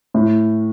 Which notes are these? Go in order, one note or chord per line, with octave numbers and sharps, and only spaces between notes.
A2